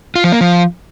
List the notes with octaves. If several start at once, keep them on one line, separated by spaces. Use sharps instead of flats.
F4
F3
A#3
F3